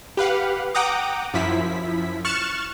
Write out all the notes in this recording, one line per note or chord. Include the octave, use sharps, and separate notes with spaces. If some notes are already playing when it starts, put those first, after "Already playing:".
G4 B4 F5 F#5
F#5 G5 A#5 D6 D#6
F#2 F3 E4 B6
C#6 F6 F#6 A6 C#7 E7